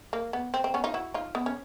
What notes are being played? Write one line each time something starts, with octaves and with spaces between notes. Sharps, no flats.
A#3
B3
C4
C4
B3 C#4
D#4 F4
E4 F#4
D#4 F4
B3
C#4